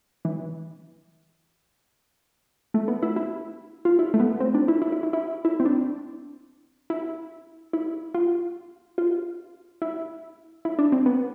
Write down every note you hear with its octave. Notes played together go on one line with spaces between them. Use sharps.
E3
A3
B3
E4
E4
F4
E4
A3
B3
C4
D4
E4
E4
E4
E4
E4
E4
C4
D4
E4
E4
F4
F4
E4
E4
D4
C4
B3